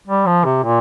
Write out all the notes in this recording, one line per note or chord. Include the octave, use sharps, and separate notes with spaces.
G3
F3
C3
A#2